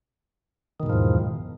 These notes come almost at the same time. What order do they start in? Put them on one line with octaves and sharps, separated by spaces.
D#3 B2 G#2 F3 E2